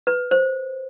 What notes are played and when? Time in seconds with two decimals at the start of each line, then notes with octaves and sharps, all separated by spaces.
0.07 B4
0.31 C5